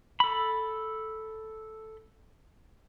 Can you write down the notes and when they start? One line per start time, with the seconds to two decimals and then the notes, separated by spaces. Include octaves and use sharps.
0.20 A4 B5